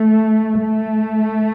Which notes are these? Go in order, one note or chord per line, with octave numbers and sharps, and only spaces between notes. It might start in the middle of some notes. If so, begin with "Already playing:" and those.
Already playing: A3
A3